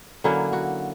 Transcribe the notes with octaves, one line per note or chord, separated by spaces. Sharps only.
D3 F#3 A#3 C#4 E4
F#4